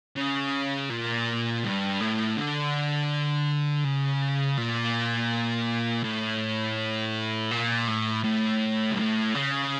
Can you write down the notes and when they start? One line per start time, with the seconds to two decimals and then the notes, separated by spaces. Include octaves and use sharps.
0.16 C#3
0.90 A#2
1.64 G2
2.01 A2
2.37 D3
3.84 C#3
4.57 A#2
6.04 A2
7.51 A#2
7.88 A2
8.24 A2
8.92 G2
8.99 A2
9.35 C#3